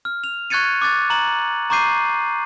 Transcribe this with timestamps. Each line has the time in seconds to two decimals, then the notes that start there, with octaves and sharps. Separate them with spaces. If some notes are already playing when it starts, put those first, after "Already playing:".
0.05 F6
0.24 F7
0.50 C#6 F#6 G#6 A6 C#7 D#7
0.82 D6 F#6 A6
1.10 A#5 F#7
1.70 A#5 C#6 D6 G6 C7 D#7